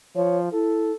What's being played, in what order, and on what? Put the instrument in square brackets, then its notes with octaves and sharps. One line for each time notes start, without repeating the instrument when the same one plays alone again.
[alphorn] F3 [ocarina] C#5
[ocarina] E4 [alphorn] A4